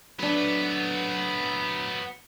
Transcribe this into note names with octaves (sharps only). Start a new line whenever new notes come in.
F#3 A3 B3 D4 B4